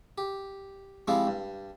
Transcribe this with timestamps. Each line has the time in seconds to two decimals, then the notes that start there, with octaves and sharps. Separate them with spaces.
0.18 G4
1.08 F3 G3 G#3 C4 E4 F4
1.27 G2